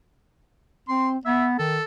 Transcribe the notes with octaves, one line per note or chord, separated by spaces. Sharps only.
C4 C6
B3 E5
D#3 A4